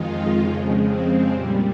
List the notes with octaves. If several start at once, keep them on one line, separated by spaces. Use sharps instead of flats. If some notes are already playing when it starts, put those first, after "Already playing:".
Already playing: F2 D#3 G#3 D#4 F4
F2 C#3 F3 G#3
C4
A#2 G3